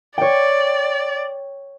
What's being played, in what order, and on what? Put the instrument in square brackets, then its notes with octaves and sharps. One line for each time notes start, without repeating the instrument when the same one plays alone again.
[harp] C#5 G5 [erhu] D5